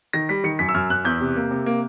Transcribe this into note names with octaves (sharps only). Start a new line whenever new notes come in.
D#3 A#6
G3 B6
D#3 C#7
F#2 B6
E6
F#2 F6
F#2 F#6
E2 G6
C3
A#3
C3
A#3